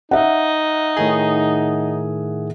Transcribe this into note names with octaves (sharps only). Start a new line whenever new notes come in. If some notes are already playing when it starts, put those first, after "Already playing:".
D#4 E5 F#5
A2 D#3 G#4